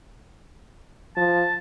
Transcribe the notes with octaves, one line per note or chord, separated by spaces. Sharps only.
F3 A5